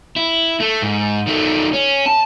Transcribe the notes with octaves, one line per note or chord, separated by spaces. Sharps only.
E4
A3
G#2
D#3 A3
C#4
A5